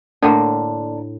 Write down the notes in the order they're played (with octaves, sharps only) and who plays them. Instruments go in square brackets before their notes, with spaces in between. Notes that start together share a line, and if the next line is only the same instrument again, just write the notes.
[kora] A2 [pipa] D3 A#3 [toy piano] D4